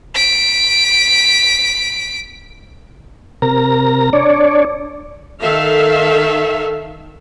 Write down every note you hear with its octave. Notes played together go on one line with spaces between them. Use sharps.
B6 D7
C3 A#4 A#5
D4 C#5 D5
D#3 A4 E5 F5